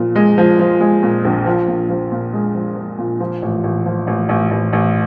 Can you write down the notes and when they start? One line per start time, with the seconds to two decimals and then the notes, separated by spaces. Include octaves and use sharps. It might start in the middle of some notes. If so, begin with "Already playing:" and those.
Already playing: A#2 F3
0.15 G#3
0.38 F3
0.59 F3
0.81 G#3
1.03 A#2
1.25 A#1
1.46 F3
1.68 A#2
1.89 F3
2.12 A#2
2.33 G#3
2.55 F3
2.77 F3
2.98 A#2
3.20 F3
3.42 A1
3.64 A1
3.86 F3
4.07 A1
4.29 A1
4.51 A1
4.73 A1